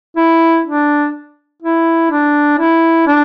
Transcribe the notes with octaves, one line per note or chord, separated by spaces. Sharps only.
E4
D4
E4
D4
E4
D4